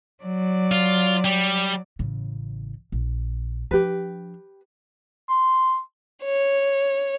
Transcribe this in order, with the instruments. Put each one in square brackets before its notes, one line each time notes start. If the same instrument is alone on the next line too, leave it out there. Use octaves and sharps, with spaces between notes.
[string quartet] F#3 D5
[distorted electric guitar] F4
G3
[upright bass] A1 C#3
A#1
[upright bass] F3 D4 [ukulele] G4 B4
[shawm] C6
[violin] C#5